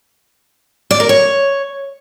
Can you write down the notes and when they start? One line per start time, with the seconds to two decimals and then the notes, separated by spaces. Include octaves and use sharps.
0.91 D5
1.00 A#4
1.09 C#5